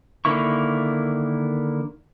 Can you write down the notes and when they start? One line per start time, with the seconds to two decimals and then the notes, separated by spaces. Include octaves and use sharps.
0.25 D3 D#3 A#3 E4 C#6